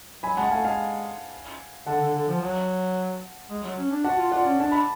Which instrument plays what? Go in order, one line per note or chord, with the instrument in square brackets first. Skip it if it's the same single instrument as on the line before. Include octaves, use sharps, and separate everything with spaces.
[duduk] F#3 [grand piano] G#5 B5
[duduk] G#3 [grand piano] F#5 A5
[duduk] A3 [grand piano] F5 G#5
[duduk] G#3 [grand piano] F5 G#5
[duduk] D3 [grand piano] F#5 A5
[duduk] D3
D3
F3
F#3
G#3
F#3
C#4
D4
[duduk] F#4 [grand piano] F#5 A5
[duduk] F4
[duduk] F4 [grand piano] D5 F#5
[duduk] C#4
[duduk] D4 [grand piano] A5
[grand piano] B5